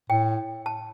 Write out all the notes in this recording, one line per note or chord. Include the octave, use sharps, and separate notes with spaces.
A2 G5
A5